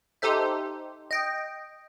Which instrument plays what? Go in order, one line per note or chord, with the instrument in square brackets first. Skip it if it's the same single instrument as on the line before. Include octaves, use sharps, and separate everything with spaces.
[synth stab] D#4 G4 A4 C5 E5
D#5 G5